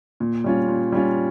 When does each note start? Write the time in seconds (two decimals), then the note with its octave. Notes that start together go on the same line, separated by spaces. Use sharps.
0.20 A#2
0.44 G3 C#4 F4
0.68 A#2
0.92 G3 C#4 F4